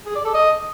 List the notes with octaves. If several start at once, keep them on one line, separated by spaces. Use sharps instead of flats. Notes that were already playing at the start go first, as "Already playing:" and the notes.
G#4
D5
A4
D#5